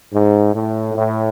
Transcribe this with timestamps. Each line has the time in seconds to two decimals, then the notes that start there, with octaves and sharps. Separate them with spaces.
0.13 G#2
0.54 A2
0.95 A2